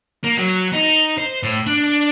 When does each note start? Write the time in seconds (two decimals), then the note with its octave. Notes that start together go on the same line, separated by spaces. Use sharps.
0.24 A#3
0.37 F#3
0.73 D#4
1.18 C5
1.43 A2
1.66 D4